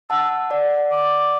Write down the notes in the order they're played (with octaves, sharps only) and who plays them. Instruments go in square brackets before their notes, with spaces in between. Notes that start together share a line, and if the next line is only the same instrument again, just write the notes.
[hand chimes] F#5 A5 [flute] E6
[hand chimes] D5 F#5
[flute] D6